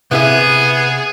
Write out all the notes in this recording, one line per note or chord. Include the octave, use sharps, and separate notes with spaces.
C3 B3 E4 G#4 E5